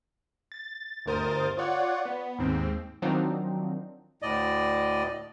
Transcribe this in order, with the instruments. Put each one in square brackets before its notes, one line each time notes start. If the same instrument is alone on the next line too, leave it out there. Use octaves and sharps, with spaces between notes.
[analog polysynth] A6
G1 D2 A#4 C5 D#6 A6
F4 C#5 D5 F#5
B3
D#2 G#2 C4
D#3 F3 F#3 C4 D4 D#4
[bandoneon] D2 A2 D5 D#5